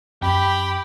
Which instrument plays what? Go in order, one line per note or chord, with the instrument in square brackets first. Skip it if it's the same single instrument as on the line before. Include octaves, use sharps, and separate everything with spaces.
[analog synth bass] F#2 [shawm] G4 [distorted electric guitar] G5 [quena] B5